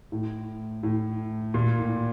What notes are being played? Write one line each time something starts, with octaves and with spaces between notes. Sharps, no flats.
A2
A2
A#2
A2